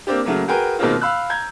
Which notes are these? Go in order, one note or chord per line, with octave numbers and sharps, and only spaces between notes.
A#3 C4 D4 G4
C#3 F#3 A3 A#3
F#4 G#4 A#4 B4 G5 G#5
B2 D#3 G#3 A#3 C4 F4
F5 B5 E6 F#6
A#5 G6 G#6